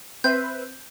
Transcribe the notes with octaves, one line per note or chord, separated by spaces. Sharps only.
C4 B4 C5 E5 G6